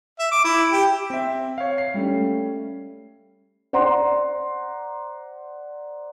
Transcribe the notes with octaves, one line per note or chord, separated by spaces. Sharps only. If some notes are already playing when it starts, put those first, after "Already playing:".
E5
D6
E4
G4
C4 E5
C#5 F5
C7
G3 A3 C#4
C5 D5 F#5 A#5 C6